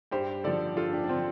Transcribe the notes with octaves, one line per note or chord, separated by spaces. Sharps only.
G2 G4 C5
D3 F3 A4 D5
G2 F4 A4
D4 G4
D4
D3 F3 C4 F4